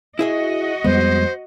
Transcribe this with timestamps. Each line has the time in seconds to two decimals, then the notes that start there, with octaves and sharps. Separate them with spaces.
0.19 E4 F#4 G#4 D#5 E5
0.84 F2 G3 G#3 B3 C5